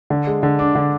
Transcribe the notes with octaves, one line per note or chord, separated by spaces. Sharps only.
D3
G#3
D3
D4
D3